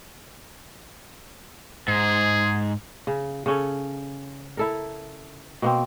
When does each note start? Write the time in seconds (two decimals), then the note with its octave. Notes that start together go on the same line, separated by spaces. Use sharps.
1.88 G#2 G#4
3.07 C#3
3.46 C#3 C#4 A4
4.57 E4 A4 A#4
5.62 B2 A#3 C4